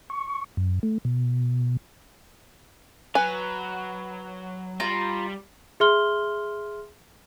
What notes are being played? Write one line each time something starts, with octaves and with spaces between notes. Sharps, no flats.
C#6
F#2
A3
B2
F#3 B4 G#5
G3 F4 A#5
G#4 E5 C6 F6 G7